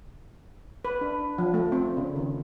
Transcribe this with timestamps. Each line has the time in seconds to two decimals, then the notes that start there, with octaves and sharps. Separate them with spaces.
0.85 B4
1.01 D4
1.38 F3
1.54 A3
1.72 C4
1.97 C#3
2.16 D#3